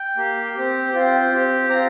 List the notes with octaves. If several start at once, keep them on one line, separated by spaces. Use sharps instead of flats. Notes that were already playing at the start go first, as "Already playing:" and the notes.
Already playing: G5
A#3 G4
C4 G4
C4 F4 G5
C4 G4
C4 F4 A#5